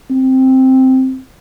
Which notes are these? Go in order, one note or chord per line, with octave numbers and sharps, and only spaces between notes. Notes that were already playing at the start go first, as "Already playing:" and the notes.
C4